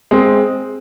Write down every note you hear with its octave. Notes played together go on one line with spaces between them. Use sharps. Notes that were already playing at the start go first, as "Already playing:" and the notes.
G#3 C4